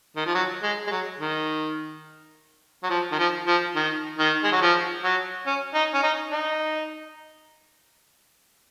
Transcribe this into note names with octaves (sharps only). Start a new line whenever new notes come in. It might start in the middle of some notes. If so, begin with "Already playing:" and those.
D#3
F3
F#3
G#3
G#3
F#3
D#3
F#3
F3
D#3
F3
F3
D#3
D#3
G#3
F#3
F3
F#3
C#4
D#4
C#4
D#4
D#4